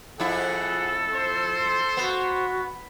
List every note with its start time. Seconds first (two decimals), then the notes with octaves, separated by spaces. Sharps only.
0.20 F2 E4 G#4 A4 F#5
1.14 C5 C6
1.97 B3 F#4